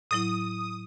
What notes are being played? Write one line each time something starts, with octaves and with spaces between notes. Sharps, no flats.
A2 F#3 E4 D#6